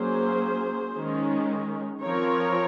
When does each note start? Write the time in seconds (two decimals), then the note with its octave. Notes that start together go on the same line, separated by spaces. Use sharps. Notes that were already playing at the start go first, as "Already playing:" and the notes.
Already playing: F#3 A#3 C#4 G#4 C5
0.93 D#3 G#3 C#4
2.01 F3 C4 A#4 C#5